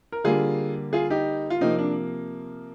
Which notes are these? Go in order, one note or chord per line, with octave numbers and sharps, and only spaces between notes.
A#4
D3 G3 A#3 F4 G#4
F4 G#4
D#4 G4
F4
C3 F3 A#3 C4 D#4
D4